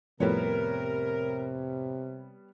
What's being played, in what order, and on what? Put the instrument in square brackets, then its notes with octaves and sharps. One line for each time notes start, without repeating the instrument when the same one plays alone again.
[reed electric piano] F2 A2 [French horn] C3 [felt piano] G3 B3 C#5 [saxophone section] A#4